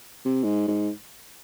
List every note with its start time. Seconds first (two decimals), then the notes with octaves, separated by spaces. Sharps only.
0.25 C3
0.44 G#2
0.68 G#2